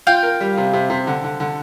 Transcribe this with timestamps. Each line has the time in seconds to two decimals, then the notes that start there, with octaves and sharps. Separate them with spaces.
0.07 F4 F5 G5
0.23 A#4
0.41 G3
0.57 C3
0.73 C3
0.90 C3
1.07 D3
1.24 D3
1.40 D3